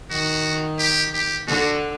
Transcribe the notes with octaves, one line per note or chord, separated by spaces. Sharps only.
D#3 F#4
G4
G4
D3 F#4